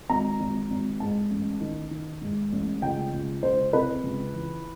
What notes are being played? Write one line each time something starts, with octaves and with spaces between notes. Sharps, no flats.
G#1 A#5
G#1
G#1
G#2 A5
A1
D#3
D#3
G#2
A1
C#2 G5
C#2
C#2 C5
C3 B4
C#2
E3